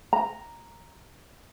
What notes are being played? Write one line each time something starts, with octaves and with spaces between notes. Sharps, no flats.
A#5